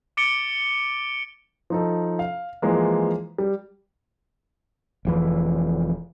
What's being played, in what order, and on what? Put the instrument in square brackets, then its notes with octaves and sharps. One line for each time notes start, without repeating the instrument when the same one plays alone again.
[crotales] D6 A6 C#7 D7 G7
[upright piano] F3 D#4 A4
F5
E3 F3 G#3 A#3
G3
[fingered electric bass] F1 F2 E3